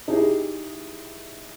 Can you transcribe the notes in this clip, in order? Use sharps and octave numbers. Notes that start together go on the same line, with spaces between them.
D#4 E4 G4 G#4